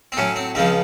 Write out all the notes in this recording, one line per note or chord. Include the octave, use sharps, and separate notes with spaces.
C4
A2 F#3 C#4
C4
C#2 C#3 F3 C4